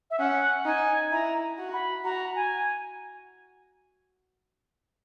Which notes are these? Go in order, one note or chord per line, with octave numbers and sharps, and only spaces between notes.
E5
C#4 F#5
D#4 G#5
E4 A#5
F#4
B5
F#4 A#5
G#5